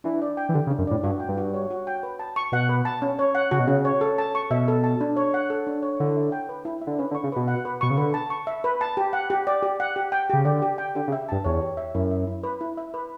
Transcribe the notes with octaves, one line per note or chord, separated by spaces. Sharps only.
E3 D4
D5
G5
E3
D3 G4
C#3
D4
F#2
A2 D5
G2 F#4
G5
G2
F#4
C#5
F#4
G5
B4
A5
C#6
B2 F#5
B4
A5
C#4
C#5
F#5
C#3 F#4
B2
C#3 C#4
C#5
A4
A5
C#6
B2 E5
A4
A5
D4
C#5
F#5
A4
D4
C#5
D3 E4
E5
G5
B4
E4
E5
D3
C#3 B4
D3
C#6
C#3
B2 B4
F#5
B4
B2 C#6
C#3
D3 B4
A5
C#6
E5
B4
A5
G4
F#5
G4
D5
G4
F#5
G4
G5
C#3 G4
D3 D5
G4
G5
D3 G4
C#3
E5
G2 A5
E2 C#5
G4
E5
F#2 E4
E5
E4
B4
E4
E5
B4